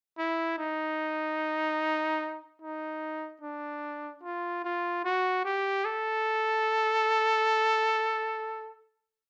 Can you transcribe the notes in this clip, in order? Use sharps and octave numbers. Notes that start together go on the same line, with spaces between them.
E4
D#4
D#4
D4
F4
F4
F#4
G4
A4